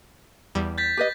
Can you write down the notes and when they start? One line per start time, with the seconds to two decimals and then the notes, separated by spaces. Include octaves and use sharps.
0.55 E2 G3
0.78 G6 A6 B6
0.97 G4 B4 D#5